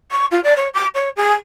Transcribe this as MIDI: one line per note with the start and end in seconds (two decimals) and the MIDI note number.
0.12 0.26 85
0.31 0.41 65
0.44 0.54 74
0.56 0.68 73
0.74 0.87 86
0.95 1.09 73
1.17 1.33 68